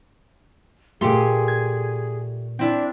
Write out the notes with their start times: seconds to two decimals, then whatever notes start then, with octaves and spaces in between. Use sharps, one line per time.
1.01 A#2 A3 G4 G#4 C6
1.48 G#6
2.59 C4 D4 E4